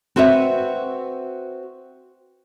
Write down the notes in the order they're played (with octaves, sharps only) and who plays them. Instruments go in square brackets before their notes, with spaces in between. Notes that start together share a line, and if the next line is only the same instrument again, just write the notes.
[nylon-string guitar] C4 F#4 B4 C#5 E5